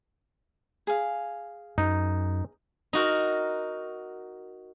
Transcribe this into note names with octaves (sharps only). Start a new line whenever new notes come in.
G#4 F5
F#2 D#4
D#4 F#4 A#4